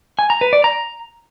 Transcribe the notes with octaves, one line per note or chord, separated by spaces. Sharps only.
G#5
A#5
B4
D5
A#5